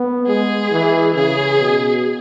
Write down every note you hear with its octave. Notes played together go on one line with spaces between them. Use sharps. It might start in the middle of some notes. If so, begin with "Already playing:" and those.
Already playing: B3
G#3 G#4
E3
C#3 G#4
B2